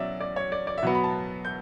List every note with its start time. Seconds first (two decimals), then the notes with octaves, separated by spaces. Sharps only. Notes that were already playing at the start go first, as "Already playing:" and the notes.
Already playing: B2 F#3 C#4 D5 E5
0.21 D5
0.36 C#5
0.52 D5
0.67 D5
0.78 E5
0.83 B2 F#3 B3 F#5
0.95 B5
1.04 A5
1.45 G6